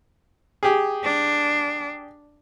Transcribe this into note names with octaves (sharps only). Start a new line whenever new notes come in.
G4 G#4
D4